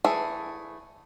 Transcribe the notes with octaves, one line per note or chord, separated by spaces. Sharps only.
E3 A3 G#4